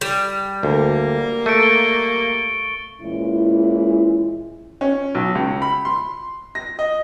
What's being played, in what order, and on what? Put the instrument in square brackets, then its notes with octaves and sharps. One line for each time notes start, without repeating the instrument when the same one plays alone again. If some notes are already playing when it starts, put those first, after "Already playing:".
[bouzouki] G3
[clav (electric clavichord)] D2 [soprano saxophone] A#3
[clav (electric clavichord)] A3 [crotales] C#6 C#7 D7
[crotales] A6 G7
[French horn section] A#2 E3 G#3 C#4 E4
[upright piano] C#4
B1
C#2
B5
C6
A#6
D#5